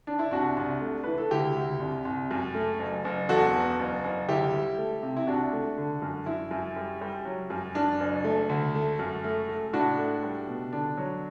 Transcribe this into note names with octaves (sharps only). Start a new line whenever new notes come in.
D4
E4
C2 D4 F#4
C2
A3
E3 B4
A4
D2 E4 G4
D2
C2
C2
F#2
A3
F#1
F#1
E1 F#4 A4
E2
F#1
F#1
D2 E4 G4
G3
A3
C3
E4
C2 D4 F#4
A3
D3
F#2
F#2 E4
F#2
G3
G3
F#3
F#2
F#2 D4
F#1
A3
D2
A3
F#2
A3
A3
A2 D4 F#4
A3
G3
B2
D3 D4
F#3